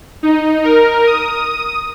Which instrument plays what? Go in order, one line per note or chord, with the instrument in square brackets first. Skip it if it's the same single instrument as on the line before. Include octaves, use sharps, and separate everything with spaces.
[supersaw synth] D#4
A#4
D#6